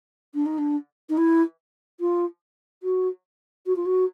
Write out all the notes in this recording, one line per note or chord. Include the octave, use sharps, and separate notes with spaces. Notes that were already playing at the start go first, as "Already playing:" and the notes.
D4
D#4
D4
D#4
E4
F4
F#4
F#4
F4
F#4